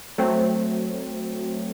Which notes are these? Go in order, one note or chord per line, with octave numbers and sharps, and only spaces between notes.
F#3 A3 C4